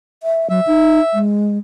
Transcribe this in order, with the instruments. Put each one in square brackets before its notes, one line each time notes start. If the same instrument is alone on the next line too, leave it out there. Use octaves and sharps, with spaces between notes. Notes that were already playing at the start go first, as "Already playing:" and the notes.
[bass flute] E5
[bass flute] F#3 [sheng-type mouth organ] E5
[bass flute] D#4
G#3